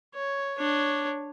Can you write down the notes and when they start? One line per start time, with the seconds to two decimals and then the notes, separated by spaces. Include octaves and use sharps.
0.14 C#5
0.58 D4 C#5